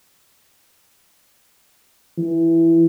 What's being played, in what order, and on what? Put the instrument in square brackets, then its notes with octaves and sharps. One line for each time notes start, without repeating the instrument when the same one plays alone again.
[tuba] E3